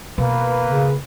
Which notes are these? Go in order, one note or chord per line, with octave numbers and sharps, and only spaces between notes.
B2 A#3 B4
C#3